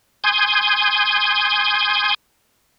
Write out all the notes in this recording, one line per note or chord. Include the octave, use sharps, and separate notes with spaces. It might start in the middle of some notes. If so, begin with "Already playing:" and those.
G#5 C6 D#6 G6 G#6